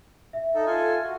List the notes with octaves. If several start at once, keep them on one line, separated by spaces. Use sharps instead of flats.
E5
D#4 A4
F4 A4 G#5
F#4